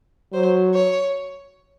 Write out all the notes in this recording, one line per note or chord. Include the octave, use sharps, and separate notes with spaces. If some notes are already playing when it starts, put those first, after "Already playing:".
F#3 C5
C#5